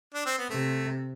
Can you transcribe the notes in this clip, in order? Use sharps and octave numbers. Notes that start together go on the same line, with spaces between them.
D4
C4
B3
C3 A3